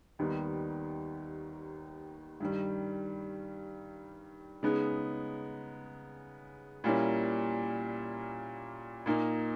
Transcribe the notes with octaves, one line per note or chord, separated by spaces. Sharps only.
D#2 D#3 G3 B3
G2 D#3 G3
C#3 G#3 B3 D#4
A#2 G3 A#3 C#4 E4
A#2 A#3 D#4